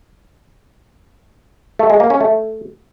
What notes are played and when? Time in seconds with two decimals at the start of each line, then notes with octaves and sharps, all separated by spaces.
1.79 A3
1.90 G#3
2.00 A#3
2.10 C#4
2.21 A3